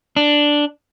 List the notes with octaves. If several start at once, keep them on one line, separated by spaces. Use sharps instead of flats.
D4